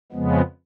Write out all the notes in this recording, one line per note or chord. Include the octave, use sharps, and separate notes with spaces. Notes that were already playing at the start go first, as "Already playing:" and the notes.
F2 C#3 F3 G#3 B3